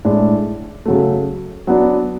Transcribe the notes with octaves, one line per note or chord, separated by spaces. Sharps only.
A2 G#3 D4
C#3 F#3 A3
F#3 B3 D4